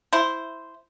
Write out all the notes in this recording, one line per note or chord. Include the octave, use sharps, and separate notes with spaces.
E4 C5